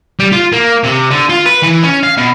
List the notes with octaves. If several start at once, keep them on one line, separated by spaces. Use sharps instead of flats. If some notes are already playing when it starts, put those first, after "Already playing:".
G3
F4
A#3
C3
D3
F4
B4
E3
C#4
F5
B2